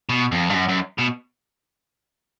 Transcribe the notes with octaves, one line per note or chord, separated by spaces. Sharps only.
B2
F2
G2
F#2
F#2
B2